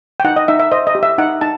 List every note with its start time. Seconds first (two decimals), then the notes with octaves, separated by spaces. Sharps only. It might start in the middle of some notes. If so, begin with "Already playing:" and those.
0.20 G5
0.24 D#4 F#5
0.36 D#5
0.48 D#4 E5
0.60 E5
0.72 C5 D#5
0.87 D#5
0.95 G4
1.03 E5
1.18 D#4 F#5
1.41 D#4 A5